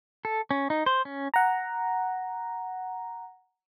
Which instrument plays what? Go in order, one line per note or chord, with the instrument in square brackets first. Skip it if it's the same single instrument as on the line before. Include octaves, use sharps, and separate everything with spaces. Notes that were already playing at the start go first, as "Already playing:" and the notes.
[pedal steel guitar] A4
C#4
D#4
C5
C#4
[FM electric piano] F#5 A#5